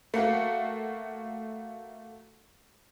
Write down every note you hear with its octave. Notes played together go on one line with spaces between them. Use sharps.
A3 A#3 F#4